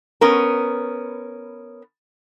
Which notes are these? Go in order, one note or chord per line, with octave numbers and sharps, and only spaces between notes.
B3 C#4 A#4